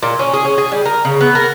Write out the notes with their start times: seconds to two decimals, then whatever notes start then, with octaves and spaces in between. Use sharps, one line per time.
0.03 A#2
0.19 C#4
0.33 G#4
0.45 C#4
0.58 G#4
0.72 G3
0.85 A#4
1.05 C#3
1.21 B3
1.35 A#4